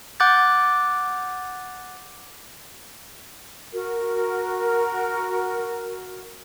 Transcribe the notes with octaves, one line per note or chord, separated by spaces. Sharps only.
F#5 D6 F#6 G6 A6
F#4 A#4